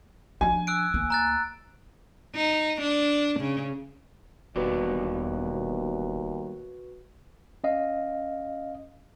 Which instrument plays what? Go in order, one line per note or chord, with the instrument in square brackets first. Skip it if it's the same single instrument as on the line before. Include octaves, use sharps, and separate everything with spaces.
[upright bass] F3 D4 [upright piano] G#5
[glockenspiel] E6 F#6 D7
[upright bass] D2 A#3
[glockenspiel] A#5 F#6 A6
[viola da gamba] D#4
D4
C#3
[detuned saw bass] E1 [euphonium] D#2 [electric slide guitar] G3 B3 D5 [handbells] F#4 B4
[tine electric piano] C#4 D#5 F5